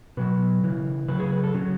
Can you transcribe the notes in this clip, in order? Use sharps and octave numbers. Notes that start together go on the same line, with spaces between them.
B2 F#3 B4
C#3 E3
C#3 F#3 B4
G#4
B4
A4
C#3 F#3